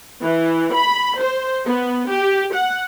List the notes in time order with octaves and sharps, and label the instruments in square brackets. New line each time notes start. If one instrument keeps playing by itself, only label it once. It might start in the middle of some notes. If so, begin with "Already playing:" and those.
[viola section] E3
B5
C5
B3
G4
F#5